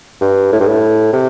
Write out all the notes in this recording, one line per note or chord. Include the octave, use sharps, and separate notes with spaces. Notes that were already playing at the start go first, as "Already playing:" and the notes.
G2
A2
G2
A2
C3